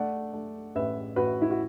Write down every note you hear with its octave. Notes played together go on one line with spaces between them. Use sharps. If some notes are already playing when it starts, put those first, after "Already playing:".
Already playing: A3 D5 F#5
A3
A1 B4 E5
A1 F#4 B4
E4
F#4